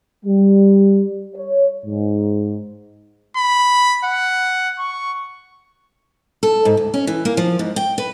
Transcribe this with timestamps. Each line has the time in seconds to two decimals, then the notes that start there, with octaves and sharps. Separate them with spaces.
0.25 G3
1.35 C#5
1.85 G#2
3.36 B5
4.05 F#5
4.79 C#6
6.43 A4
6.65 G#2
6.77 D2
6.94 C#4
7.07 E3
7.25 A#3
7.37 F3
7.59 G#2
7.76 G5
7.98 B4